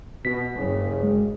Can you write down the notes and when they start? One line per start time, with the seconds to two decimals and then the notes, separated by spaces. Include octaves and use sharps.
0.25 B2 B6
0.56 F#1 G2 C#3
1.03 G#3